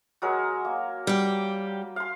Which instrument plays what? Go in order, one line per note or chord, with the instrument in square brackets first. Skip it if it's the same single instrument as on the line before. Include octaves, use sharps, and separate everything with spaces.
[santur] F#3 G#3 A#4
A#3
[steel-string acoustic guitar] G3 G4
[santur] F5 C6